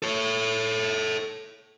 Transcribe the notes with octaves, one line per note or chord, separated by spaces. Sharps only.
A4 C#5